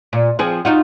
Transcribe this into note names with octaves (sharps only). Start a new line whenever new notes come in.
A#2
F3 C4 G#4
D#4 F4 F#4